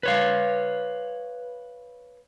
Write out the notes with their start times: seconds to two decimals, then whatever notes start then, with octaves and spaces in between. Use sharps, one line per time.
0.03 B4 C#5 F5